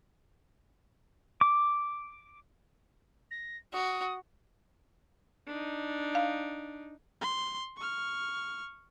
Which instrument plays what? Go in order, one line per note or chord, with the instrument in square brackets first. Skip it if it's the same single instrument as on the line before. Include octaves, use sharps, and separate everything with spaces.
[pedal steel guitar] D6
[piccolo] A#6
[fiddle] F#4 [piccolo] D#6
[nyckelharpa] D4 D#4
[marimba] F5
[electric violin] C6
C#6 F6